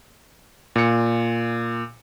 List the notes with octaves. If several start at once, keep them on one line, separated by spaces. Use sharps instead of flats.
A#2 C#7